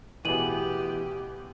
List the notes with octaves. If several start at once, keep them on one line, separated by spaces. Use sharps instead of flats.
A1 B2 E3 B3 G4 G#4 D#7 F#7